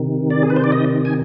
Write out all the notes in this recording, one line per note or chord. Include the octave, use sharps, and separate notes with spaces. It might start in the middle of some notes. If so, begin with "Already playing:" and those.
Already playing: C3 D#3
D5
G#4
B4
C5
D5
D#5
G#5